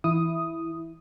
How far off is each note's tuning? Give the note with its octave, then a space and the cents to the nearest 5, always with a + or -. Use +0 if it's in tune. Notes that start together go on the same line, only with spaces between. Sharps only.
E3 +0 E4 +0 D#6 +0